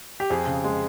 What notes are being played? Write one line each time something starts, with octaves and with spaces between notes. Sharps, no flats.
G4
F2 G#4
C#3
G#3